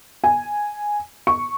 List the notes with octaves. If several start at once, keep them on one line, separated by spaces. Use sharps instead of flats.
G#5
C#6